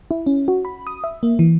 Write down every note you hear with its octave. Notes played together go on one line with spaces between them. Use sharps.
E4
C#4
F#4
B5
D#6
E5
A#3
E3